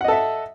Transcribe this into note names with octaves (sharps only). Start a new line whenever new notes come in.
A4 D#5 E5 F#5